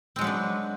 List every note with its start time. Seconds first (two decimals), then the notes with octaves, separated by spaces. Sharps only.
0.16 C4
0.19 G#3
0.21 F#3
0.24 B4
0.27 D4